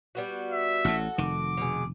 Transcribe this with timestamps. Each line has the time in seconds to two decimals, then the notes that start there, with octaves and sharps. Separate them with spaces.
0.15 G3 B3 F#4
0.51 E5
0.85 A1 A2 F#4 A4
1.18 F1 D#3 D6
1.57 B2 G#4